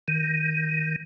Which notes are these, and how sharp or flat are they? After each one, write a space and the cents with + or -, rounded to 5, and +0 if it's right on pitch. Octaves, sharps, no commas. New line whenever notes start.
D#3 +10